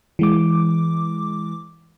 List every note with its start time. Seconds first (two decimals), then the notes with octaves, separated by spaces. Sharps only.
0.19 E3 G#3 D6